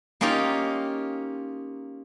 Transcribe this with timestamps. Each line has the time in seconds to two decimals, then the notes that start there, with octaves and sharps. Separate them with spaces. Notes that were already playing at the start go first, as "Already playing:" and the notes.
0.21 A#3 C#4 D#4 F4 G4